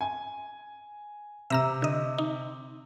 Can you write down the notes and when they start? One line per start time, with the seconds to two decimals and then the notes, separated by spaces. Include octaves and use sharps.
0.01 G#5
1.50 C3 E5 A#5 E6
1.82 D3 D#5
2.18 D#4